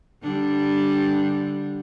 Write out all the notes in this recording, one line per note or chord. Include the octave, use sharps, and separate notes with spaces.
D3 G3 D4